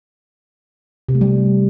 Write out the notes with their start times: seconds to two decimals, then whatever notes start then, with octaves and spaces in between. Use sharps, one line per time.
1.09 C3
1.15 A3
1.21 G3